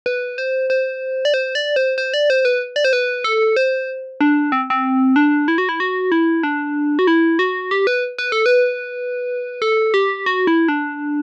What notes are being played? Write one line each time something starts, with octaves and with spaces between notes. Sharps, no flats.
B4
C5
C5
D5
C5
D5
C5
C5
D5
C5
B4
D5
C5
B4
A4
C5
D4
C4
C4
D4
E4
F#4
E4
F#4
E4
D4
F#4
E4
F#4
G4
B4
B4
A4
B4
A4
G4
F#4
E4
D4